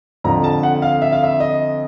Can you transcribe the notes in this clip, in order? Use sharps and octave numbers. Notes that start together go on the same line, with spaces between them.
F2 D3 F3 A#5
A5
F#5
F5
E5
F5
E5
D#5